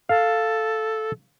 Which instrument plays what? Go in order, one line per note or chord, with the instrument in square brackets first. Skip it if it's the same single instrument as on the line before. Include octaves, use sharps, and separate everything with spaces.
[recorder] A4 [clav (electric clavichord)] F5